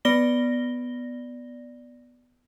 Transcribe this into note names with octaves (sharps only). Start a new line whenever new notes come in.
B3 D5 A#6 G7